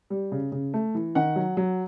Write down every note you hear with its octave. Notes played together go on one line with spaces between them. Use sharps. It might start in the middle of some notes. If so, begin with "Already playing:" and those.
G3
C#3
C#3
A3
E3
D#3 F#5
F#3
F#3